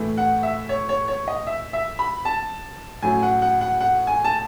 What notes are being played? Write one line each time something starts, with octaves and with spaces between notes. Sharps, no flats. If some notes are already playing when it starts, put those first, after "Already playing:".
Already playing: A2 E3 A3
F#5
E5
C#5
C#5
C#5
D#5
E5
E5
B5
A5
A2 F#3 C#4 G#5
F#5
F#5
F#5
F#5
G#5
A5